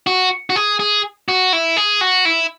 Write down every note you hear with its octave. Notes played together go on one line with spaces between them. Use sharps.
F#4
F#4
G#4
G#4
F#4
E4
G#4
F#4
E4